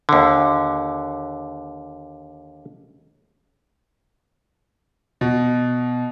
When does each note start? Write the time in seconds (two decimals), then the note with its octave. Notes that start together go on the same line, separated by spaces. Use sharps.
0.09 D#2 D3
5.21 B2